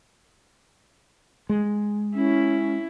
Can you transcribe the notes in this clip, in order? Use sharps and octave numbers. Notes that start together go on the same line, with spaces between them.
G#3
C#4 E4